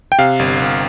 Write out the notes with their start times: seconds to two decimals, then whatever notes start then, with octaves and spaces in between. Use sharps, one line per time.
0.12 G5
0.18 C3 F5
0.39 G1
0.62 G1